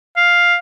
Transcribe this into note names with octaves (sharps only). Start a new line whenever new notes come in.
F5